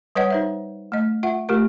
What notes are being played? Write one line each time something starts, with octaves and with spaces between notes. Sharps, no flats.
G3 B4 C#5 D#5 F#5
D#4 C5 E5
A3 D#5
F4 E5 F#5
A3 F4 G4 A#4